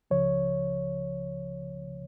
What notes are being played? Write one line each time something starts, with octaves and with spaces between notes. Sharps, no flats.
C#2 C#3 F3 C#5